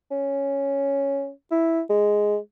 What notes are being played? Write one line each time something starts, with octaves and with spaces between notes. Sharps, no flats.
C#4
E4
G#3